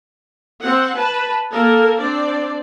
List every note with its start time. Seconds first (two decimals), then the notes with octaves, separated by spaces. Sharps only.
0.62 C4 F#5
0.94 B4 A5
1.52 A#3 A4 A#4
2.01 C4 D4 D5